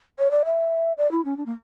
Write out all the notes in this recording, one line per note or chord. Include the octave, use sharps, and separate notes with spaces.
C#5
D5
E5
D5
E4
C#4
D4
A#3